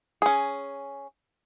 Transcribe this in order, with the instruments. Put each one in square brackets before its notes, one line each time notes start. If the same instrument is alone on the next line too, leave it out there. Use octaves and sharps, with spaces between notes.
[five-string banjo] C#4 G#4